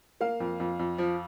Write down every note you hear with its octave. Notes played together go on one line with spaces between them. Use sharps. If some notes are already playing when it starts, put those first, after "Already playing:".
A#3 F5
F2
F2
F2
F3